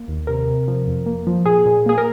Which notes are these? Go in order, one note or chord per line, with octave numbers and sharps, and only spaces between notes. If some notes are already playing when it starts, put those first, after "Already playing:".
Already playing: A#3
D#2
C3 A#4
C3
F3
F2
A#3
F3
A#2 G#4
A#2
A#3 G#4
A#4